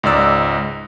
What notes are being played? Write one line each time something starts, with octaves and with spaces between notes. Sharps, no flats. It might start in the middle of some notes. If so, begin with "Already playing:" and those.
C#2 G#2 D5 E6